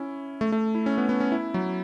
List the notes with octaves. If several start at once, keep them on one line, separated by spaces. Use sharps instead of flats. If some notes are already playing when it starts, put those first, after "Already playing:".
Already playing: C#4 E4
A3
A3
E4
C#4
B3
B3
C#4
E4
F#3